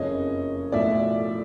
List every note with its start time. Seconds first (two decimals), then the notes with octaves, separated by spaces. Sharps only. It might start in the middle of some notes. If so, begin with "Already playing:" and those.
Already playing: F#1 F2 C#3 C#5 D#5
0.72 B1 A2 F3 D5 E5